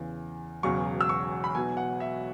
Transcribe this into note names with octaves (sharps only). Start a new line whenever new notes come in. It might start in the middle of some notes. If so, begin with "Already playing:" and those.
Already playing: E2 C#3 E3
E1 E2 C#3 F#3 C#6
E6
C#6
B5
B1 B2 F#3 G#5
F#5
E5